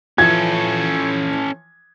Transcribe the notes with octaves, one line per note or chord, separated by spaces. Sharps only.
E3 F3 C#4 A4 G#6